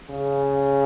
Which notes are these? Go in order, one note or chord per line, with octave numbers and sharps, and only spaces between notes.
C#3